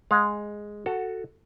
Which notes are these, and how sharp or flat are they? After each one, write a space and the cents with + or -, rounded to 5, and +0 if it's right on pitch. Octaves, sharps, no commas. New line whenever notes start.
G#3 +0 F5 +35
F#4 +0 A4 +10 A5 +45